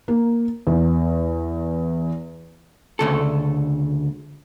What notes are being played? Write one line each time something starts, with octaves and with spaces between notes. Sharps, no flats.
A#3
E2
D2 C#3 A4